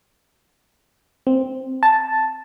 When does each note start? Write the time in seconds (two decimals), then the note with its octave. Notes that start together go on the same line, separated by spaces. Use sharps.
1.27 C4
1.83 A5